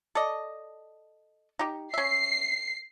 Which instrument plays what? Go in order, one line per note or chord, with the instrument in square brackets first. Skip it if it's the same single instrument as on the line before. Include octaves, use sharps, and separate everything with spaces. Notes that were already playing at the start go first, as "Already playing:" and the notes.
[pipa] A4 D5 D#5
D#4 G4
[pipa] C#4 E5 [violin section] C7